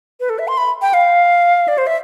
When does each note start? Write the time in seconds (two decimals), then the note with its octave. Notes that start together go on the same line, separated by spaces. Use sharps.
0.20 B4
0.29 A4
0.39 E5
0.48 C6
0.57 B5
0.82 G5
0.94 F5
1.68 D5
1.78 C5
1.87 E5